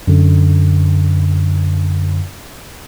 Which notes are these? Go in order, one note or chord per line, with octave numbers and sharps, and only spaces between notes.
F#2 D3